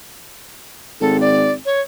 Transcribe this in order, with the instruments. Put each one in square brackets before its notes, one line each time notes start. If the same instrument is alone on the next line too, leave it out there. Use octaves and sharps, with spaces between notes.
[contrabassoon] G#1 [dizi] A4
[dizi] D5
C#5